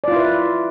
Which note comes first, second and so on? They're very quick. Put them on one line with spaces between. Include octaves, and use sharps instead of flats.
D5 F4 E4 B4